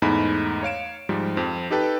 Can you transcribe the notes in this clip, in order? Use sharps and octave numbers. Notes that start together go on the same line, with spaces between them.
E2 G#2 A3 D#4 B5
C#5 F5 D7 E7
G#2 F3 G3
F2 C4
D#4 G4 A4 B4 G5 A5